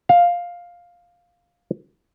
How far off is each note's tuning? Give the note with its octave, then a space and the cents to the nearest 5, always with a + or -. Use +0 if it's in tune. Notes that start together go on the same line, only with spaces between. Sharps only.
F5 +5